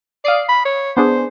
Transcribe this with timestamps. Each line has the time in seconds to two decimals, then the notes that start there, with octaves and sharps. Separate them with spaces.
0.25 D5 F5 D#6 C7
0.49 B5
0.65 C#5
0.97 B3 D4 G#4 C5